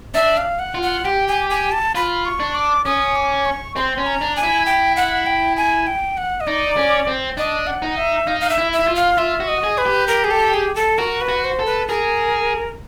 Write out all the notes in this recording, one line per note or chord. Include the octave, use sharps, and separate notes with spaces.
D4 E5
F5
F#5
F4
F#5
G4 G5
G#5
G#5
A5
F4 B5
C#6
D4
D6
C#4 D#6
D6
C#6
C4 C6
C#4
A#5
D4
G#5
E4
G5
F#5
G5
G#5
G5
F#5
D#5
D#4 D5
C#4
C4
D4 D#5
F#5
D#4
E5
D#4 F5
F5
E5
E4
E5
E4
F4
F5
F4 E5
F#4
D#5
G#4
B4
G4
A#4
G#4
A4
G#4
A4
F#4 A#4
B4
F#4
C5
A4
B4
G#4 A#4